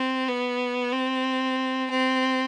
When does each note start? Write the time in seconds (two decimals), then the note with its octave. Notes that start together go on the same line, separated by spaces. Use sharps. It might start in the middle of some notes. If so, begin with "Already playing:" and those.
Already playing: C4
0.28 B3
0.92 C4
1.91 C4